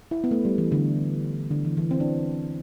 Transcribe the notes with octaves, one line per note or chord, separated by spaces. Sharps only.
E4
B3
A3
G3
E3
D3
D3
E3
E3
C4
D4